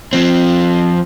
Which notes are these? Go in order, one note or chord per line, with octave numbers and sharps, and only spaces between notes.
F3 C4